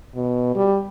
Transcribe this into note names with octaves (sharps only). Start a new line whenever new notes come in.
B2
G3